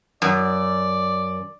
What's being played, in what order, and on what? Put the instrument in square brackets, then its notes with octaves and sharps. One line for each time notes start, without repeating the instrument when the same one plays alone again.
[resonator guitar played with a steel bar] F#2 [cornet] D5